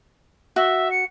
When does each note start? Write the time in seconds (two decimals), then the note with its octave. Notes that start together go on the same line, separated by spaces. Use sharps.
0.56 F#4 E5
0.91 C#7